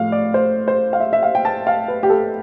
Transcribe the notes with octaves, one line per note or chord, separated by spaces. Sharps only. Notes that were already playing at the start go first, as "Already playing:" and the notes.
Already playing: A2 F3 F5
D5
C5
C5
F5
E5
E5
F5
G5
A5
F5
B4
G4
A4